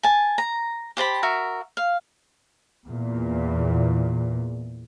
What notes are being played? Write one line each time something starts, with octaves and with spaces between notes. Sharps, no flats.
G#5 A5
A#5
G4 C5 A5 B5
F#4 A#4 E5
F5
E2 A#2